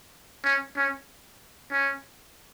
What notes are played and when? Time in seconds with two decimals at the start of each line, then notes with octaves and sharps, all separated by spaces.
0.44 C#4
0.77 C#4
1.71 C#4